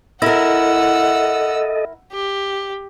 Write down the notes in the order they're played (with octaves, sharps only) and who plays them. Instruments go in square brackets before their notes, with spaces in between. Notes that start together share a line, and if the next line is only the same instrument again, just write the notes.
[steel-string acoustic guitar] E4 A#4 [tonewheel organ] A4 D#5 [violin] F#5 E6
[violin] G4